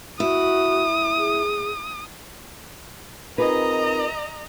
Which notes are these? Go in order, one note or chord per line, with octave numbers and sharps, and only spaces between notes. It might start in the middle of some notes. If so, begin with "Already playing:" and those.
E4 F#4 D#6
G#4
C4 D#4 F4 G#4 A#4 B4 D#5 A#5